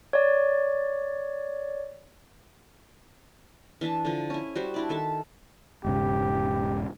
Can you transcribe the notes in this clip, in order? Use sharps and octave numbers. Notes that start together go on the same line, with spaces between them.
C#5 D5
E3 D4 E5 A5
D3 F3
C#4 E4
G3 F#4 C5
D4 E4 D5
D#3 A4 E5 A5
E1 G#2 C#3 G4